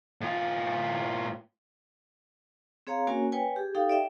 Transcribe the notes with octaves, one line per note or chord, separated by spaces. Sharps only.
A2 F4
C4 G#4 C#5 F5 A#5
A#3 C#4 F#4 A#4 C#5 G#5
B4 C#5 G5 G#5
G4 G#4
D#4 G4 A4 F5 G5
D5 E5 G5